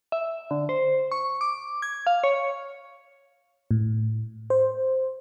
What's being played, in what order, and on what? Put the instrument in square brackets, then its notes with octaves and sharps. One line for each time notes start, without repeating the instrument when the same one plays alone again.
[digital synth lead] E5
D3
C5
C#6
D6
G#6
F5
C#5
[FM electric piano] A2
C5